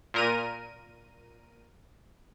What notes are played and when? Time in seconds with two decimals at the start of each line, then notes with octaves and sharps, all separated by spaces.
0.14 A#2 A#4 D#7